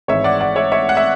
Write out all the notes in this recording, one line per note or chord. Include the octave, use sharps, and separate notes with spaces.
G#1 G#2 E3 C#5 E5
D5 F#5
D5 F#5
C#5 E5
C#5 E5
F#5
E5